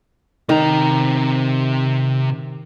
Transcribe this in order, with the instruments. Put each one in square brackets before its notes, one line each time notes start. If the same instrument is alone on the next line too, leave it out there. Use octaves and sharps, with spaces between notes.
[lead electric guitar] C3 A#5 [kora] D#3